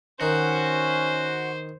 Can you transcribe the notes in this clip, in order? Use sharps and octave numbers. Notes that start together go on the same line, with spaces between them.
D#3 C#4 F#4 C5